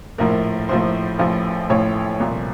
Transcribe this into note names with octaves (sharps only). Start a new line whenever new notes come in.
A#1 A2 F3 A#4
A#1 A2 F3 C5
A1 A2 F3
A1 A2 F3 C#5
C2 A#2 F3